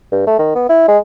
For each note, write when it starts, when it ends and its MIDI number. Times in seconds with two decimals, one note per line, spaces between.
0.12 0.26 43
0.27 0.38 57
0.39 0.53 51
0.55 0.68 59
0.69 0.88 64
0.89 0.98 56